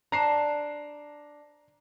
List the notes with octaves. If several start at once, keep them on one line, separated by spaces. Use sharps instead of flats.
D4 C5 A#5 C7